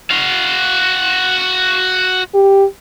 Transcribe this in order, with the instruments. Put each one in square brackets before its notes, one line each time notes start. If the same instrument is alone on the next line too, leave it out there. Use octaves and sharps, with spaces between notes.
[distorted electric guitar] F#4 F5
[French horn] G4